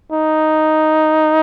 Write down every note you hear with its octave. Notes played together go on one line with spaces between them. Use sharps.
D#4